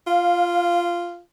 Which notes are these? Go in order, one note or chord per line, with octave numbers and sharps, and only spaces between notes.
F4 F5